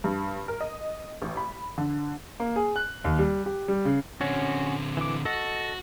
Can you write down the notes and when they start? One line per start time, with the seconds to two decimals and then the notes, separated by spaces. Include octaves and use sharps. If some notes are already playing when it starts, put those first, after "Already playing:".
0.04 G2
0.48 A#4
0.61 D#5
1.22 A1
1.37 B5
1.78 D3
2.40 A#3
2.56 G#4
2.76 F#6
3.04 D#2
3.19 G3
3.46 G4
3.68 G3
3.85 C#3
4.21 D3 C4 C#4 F#4
4.97 E3 D6
5.25 F#4 A4 D#5